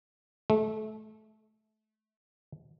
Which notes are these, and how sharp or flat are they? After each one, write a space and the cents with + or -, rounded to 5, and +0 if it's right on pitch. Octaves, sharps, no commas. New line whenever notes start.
A3 -25